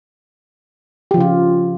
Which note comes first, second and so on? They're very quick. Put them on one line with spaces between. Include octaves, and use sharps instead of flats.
G4 F3 C#3 F4